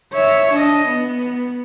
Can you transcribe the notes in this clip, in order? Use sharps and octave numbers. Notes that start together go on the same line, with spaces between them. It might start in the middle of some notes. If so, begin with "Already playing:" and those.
C#5 E5
D4 D#5
B3